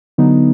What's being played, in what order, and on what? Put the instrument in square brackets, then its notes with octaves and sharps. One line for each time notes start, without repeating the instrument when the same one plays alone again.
[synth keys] D3 F#3 B3 D#4